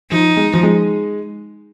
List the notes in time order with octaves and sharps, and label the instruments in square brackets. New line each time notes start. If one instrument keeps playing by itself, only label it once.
[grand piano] F3 [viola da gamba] D#4
[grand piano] G#3
F3
G#3